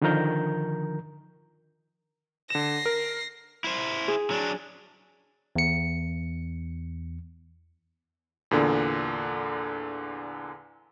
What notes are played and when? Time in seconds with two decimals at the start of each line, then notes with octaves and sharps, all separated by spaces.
0.02 D3 D#3 F3 A#4 A#5 G6
2.50 D3 A#6 C7 E7
2.86 A#4
3.64 E4 C5
4.08 G#4
4.31 F#3 D4
5.56 E2 C#7
8.51 E2 A#2 D3